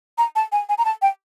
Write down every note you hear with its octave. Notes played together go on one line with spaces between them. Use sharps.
A#5
A5
G#5
G#5
A#5
A5
G5